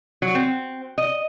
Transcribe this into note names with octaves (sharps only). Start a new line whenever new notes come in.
F#3
C4
D#5